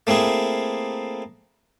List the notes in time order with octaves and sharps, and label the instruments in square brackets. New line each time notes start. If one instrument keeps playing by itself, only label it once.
[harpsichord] A3 A#3 C4 E4 G#4